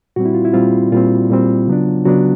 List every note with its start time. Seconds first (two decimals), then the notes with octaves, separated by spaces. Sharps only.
0.16 A#2 G3 C4 F#4
0.25 E4
0.34 F4
0.45 E4
0.53 A#2 G3 C4 F4
0.92 A#2 G3 C4 F4
1.29 A#2 G3 C4
1.68 C#3 F#3 B3 D4
2.05 C#3 F#3 B3 D4 F#4